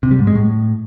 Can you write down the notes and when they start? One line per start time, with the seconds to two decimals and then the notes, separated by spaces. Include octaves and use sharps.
0.03 C3
0.11 G3
0.19 G#2
0.27 G#3
0.35 A2